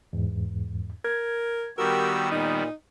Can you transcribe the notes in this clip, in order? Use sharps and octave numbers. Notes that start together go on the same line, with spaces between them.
E2 G#2
A#4 G#6
D#3 G3 B3 F#4 G4 A#4 E6
A#2 D#4